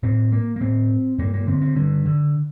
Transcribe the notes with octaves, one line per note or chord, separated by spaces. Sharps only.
A2 C4
A#3
A#3
A2 C4
G2 A#3
A#3
D3 C4
C4
G2 D3
D3